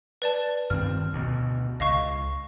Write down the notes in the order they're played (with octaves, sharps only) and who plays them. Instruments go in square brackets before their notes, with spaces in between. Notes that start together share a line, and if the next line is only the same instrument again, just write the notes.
[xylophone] B4 D5 A5
[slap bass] G2 D#3 C4 [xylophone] F6
[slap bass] D2 B2
[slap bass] C#2 [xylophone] D#5 F5 C#6